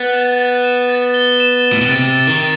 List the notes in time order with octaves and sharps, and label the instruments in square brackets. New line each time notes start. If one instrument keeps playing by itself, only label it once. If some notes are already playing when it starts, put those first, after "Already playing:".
Already playing: [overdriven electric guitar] B3 [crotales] A6
[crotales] E7
A6
E7
A6
G7
E7
G7
[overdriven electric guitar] A2
B2
[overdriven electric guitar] C3 [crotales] A6
[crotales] A6
[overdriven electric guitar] D#3
[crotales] A6